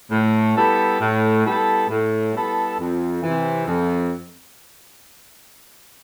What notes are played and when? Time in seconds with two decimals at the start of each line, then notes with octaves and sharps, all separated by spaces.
0.11 A2
0.55 G3 B3 E4 A4
1.00 A2
1.45 G3 B3 E4 A4
1.89 A2
2.34 G3 B3 E4 A4
2.78 F2
3.23 C3 E3
3.67 F2